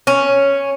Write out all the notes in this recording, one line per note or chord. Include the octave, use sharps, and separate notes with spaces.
C#4